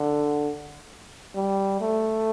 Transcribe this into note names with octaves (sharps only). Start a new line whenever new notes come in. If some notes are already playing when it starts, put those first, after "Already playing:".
Already playing: D3
G3
A3